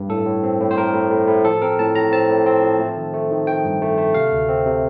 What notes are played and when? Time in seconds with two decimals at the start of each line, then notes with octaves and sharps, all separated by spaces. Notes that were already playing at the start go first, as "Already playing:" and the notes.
Already playing: G2
0.09 A2 A4
0.26 A2
0.43 C4
0.60 A2
0.71 C5
0.77 A2 A#4
0.94 A2
1.11 A2
1.28 A2
1.45 F3 A4
1.62 C4 A#4
1.79 A2 A5
1.95 A2 A#5
2.12 C4 A5
2.30 A2
2.46 C4
2.62 F3
2.79 A3
2.97 D#3
3.13 A3
3.31 D#3
3.47 D#3 G5
3.65 G2
3.82 A3
3.98 A3
4.14 C3 F5
4.32 D2
4.49 C4
4.66 C3